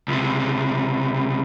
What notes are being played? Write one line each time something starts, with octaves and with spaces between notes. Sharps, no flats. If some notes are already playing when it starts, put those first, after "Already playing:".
C#2 C3